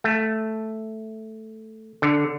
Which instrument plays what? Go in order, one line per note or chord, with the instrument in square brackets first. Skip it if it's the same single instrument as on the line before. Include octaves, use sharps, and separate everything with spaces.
[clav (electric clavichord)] A3
D3